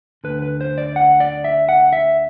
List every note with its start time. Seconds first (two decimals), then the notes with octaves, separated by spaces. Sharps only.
0.24 D2 D3 B4
0.42 B4
0.61 C5
0.78 D5
0.96 F#5
1.20 D5
1.44 E5
1.69 F#5
1.93 E5